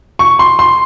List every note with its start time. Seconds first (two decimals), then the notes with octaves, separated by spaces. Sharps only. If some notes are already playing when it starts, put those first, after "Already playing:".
0.19 C#6
0.39 C6
0.59 C6